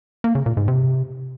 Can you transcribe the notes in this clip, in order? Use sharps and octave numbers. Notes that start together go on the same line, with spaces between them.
A#3
C#3
A#2
G#2
C3